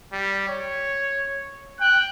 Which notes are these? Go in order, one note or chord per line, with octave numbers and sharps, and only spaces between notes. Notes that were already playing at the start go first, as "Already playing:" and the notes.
G3
C#5
G5 F#6